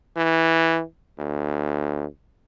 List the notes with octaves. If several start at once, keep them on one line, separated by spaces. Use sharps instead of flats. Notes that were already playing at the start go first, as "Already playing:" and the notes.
E3
D2